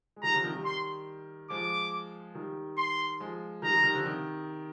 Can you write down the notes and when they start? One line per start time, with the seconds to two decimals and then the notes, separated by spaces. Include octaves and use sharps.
0.16 G#3
0.23 D#3 G3 A#5
0.34 D3 F3
0.44 C3 D#3
0.54 D#3 G3
0.65 C6
1.50 F3 G#3 D6
2.35 D#3 G3
2.77 C6
3.20 F3 G#3
3.62 D#3 G3 A#5
3.73 D#3 G3
3.83 D#3 G3
3.94 D3 F3
4.05 C3 D#3